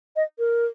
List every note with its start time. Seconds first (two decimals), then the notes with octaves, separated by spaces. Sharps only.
0.16 D#5
0.39 A#4